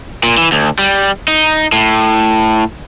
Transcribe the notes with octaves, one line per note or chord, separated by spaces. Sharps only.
A#2
E3
D2
G3
D#4
A2